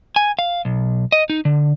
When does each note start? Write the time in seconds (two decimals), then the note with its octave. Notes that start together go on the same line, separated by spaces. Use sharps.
0.16 G#5
0.39 F5
0.65 B1
1.12 D#5
1.30 D#4
1.45 D3